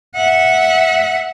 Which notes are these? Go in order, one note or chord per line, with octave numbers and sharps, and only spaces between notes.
E5 F#5